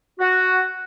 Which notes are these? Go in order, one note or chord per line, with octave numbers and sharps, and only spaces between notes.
F#4